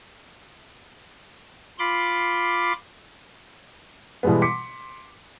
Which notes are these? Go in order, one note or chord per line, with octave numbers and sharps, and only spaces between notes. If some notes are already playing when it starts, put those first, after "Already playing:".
F4 B5 C6 D6
B2 E3 G3 G#3 B3
C6 D6 B6 C#7